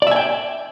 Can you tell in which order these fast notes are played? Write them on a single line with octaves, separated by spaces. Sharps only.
D5 E5 G#5 G5